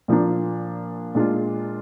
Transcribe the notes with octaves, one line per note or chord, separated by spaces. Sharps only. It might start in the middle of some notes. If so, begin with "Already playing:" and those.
A#2 F3 A#3 D4
A#2 G#3 D4 F4